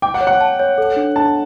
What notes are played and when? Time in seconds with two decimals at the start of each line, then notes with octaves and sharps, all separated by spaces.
0.02 G5 D6
0.14 F#5
0.21 C#5
0.27 F#5
0.41 A5
0.59 C#5
0.78 A4
0.96 D4
1.16 D4 A5